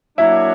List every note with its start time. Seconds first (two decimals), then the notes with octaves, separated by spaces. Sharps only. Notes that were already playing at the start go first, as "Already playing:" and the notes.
0.18 F#3 A#3 D4 E4